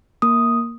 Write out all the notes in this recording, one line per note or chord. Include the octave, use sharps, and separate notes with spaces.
A#3 D#6